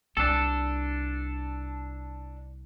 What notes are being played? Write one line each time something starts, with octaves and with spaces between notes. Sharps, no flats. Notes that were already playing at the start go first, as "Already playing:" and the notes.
C2 D4 A4